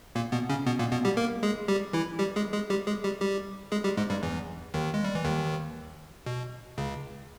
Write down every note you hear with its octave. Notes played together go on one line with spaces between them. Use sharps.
A#2 A#3
B2 B3
C#3 C#4
B2 B3
A#2 A#3
B2 B3
G3 G4
A#3 A#4
G#3 G#4
G3 G4
E3 E4
G3 G4
G#3 G#4
G#3 G#4
G3 G4
G#3 G#4
G3 G4
G3 G4
G#3 G#4
G3 G4
G#2 G#3
G2 G3
E2 E3
D#2 D#3
G#3
G3
E3
D#2 D#3
B2
C#2 C#3